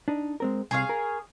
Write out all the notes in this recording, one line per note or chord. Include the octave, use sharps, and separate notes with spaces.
D4 D#4
G#3 C4 A#4
C2 C3 G#4 C#5 F5
A#4